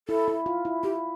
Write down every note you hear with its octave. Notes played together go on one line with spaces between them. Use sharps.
E4 A4
E4
F4
E4
E4 G4